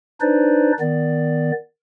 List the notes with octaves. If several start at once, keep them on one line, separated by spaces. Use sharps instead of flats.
D4 D#4 B4 C5 D5
D#3 B3 D5